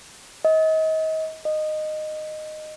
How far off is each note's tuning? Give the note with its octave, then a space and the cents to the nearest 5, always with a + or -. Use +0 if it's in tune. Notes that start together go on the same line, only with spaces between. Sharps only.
D#5 +35
D#5 -10